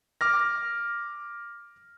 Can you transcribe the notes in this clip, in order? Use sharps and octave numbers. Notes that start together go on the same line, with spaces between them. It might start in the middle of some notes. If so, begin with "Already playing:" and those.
D6 F6 A#6